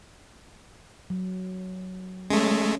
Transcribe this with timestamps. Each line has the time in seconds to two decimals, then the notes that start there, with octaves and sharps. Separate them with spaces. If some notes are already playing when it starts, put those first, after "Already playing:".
1.10 F#3
2.30 G#3 A3 C#4